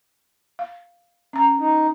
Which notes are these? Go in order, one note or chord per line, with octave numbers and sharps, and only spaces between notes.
F5
C#4 A#5
D#4